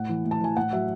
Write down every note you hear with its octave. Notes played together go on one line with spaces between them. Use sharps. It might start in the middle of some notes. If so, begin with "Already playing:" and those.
Already playing: A2 F#5
E3
A2
A5
E3 G#5
A2 F#5
F#3 E5